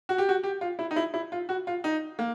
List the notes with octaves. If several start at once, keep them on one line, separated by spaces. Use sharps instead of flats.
F#4
G4
F#4
G4
F4
E4
D#4
E4
E4
F4
F#4
F4
D#4
A#3